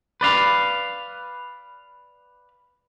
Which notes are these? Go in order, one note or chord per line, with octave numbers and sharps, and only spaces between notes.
B4 D5 F5